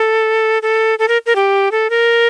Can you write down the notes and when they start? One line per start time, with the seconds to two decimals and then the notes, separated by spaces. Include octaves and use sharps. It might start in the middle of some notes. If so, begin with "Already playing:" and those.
Already playing: A4
0.62 A4
0.99 A4
1.08 A#4
1.26 A#4
1.36 G4
1.72 A4
1.90 A#4